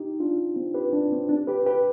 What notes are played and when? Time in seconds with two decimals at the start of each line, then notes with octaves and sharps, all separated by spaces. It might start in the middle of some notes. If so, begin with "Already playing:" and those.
Already playing: D#4 G4
0.20 D4 F4
0.56 C4
0.74 G4 B4
0.93 D4
1.12 C4
1.29 D4
1.47 G4 B4
1.66 G4 B4